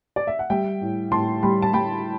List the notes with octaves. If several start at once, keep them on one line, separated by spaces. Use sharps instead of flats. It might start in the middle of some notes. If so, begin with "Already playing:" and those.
D5
E5
F#5
G3 E5 G5
A2
A2 A5 C6
G3 G5 B5
A5
G3 G5 B5